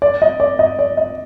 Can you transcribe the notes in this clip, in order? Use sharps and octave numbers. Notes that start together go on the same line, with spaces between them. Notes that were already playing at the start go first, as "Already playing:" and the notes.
D5
D#5
D5
D#5
D5
D#5